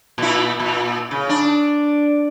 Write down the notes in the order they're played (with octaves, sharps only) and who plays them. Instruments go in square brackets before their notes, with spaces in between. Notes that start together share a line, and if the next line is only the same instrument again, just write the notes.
[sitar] A#2 E4
A#2
C#3
D4